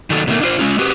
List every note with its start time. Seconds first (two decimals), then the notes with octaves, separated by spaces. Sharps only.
0.10 D#3 F#3 A4
0.27 B2 D#3 A3 A#3
0.42 D4 F4 C5
0.59 G#3 C#4 F4
0.79 F#4 G4 B4